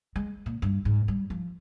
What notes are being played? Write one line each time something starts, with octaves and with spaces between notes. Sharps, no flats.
G#3
A#2
G2
G#2
G3
F3